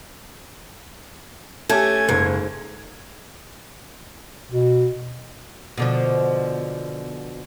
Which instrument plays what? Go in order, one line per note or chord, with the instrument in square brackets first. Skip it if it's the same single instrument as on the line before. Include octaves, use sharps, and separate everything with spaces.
[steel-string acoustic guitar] A3 C#4 [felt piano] G4 G#5 A5 [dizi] G#6
[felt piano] F#1 [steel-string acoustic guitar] G#2
[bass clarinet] B2
[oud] B2 D3 F3